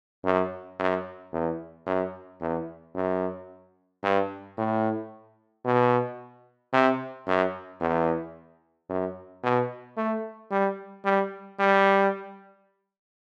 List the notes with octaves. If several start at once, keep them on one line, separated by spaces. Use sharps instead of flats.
F#2
F#2
E2
F#2
E2
F#2
G2
A2
B2
C3
F#2
E2
F#2
B2
A3
G3
G3
G3